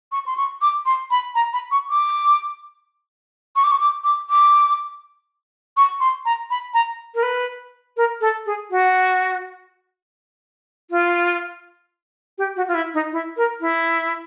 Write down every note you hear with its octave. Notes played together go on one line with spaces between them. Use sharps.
C#6
C6
C#6
D6
C6
B5
A#5
B5
C#6
D6
C#6
D6
C#6
D6
D6
D6
C#6
C6
A#5
B5
A#5
A#4
B4
A#4
A4
G#4
F#4
F4
G4
F#4
F4
E4
D#4
E4
A#4
E4